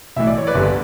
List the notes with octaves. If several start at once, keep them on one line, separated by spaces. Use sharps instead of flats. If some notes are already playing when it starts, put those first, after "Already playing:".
B1 A2 E3 E5
D5
C#5
B4 D5
G1 G2 D3